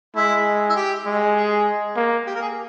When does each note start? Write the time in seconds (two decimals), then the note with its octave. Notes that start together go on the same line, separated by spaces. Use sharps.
0.16 G#3 E4
0.70 E4
0.75 G4
1.06 G#3
1.36 G#4
1.96 A#3
2.27 G4
2.35 A#4
2.42 G#4